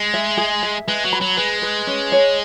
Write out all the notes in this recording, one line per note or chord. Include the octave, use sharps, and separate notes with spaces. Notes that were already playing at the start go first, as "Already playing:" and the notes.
Already playing: G#3
E5
G#4
E5
G#3 B4
F#3
B5
F#3
G#3 B4
B4
C#4
C#5